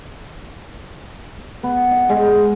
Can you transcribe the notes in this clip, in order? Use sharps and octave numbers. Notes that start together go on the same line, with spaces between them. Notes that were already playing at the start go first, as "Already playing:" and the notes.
B3
D#5
G#3
G#3